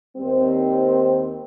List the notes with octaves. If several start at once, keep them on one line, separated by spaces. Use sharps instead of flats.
D#2 D#3 G3 C4